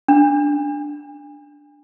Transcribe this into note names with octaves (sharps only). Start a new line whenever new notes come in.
D4